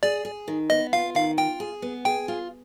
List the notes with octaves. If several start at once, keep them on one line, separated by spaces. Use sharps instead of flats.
G#4 D5
G#4
D#3
B3 D#5
F4 F5
D#3 F5
F4 G5
G#4
B3
G#4 G5
F4